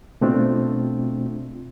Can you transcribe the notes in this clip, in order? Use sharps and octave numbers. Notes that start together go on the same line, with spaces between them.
B2 A3 C4 D4 F4